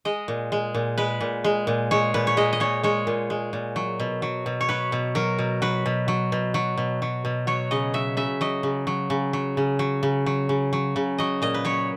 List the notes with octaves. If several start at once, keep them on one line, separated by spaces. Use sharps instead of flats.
G#3 D#5
A#2
G#3
A#2
G#3 B4
A#2
G#3
A#2
G#3 C#5
A#2 B4
C#5
G#3 D#5
D#5
A#2 C#5
G#3 C#5
A#2
G#3
A#2
F#3
B2
F#3
B2
C#5
F#3 B4
B2
F#3 A#4
B2
F#3 B4
B2
F#3
B2
F#3
B2
F#3
B2
F#3 C#5
C#3 D#5
F#3 E5
C#3 E5
F#3 D#5
C#3
F#3
C#3
F#3
C#3
F#3
C#3
F#3
C#3
F#3
C#3
F#3 D#5
A#2 D#5
B4
F#3 C#5